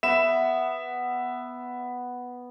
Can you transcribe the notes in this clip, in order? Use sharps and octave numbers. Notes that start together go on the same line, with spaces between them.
B3 E5 E7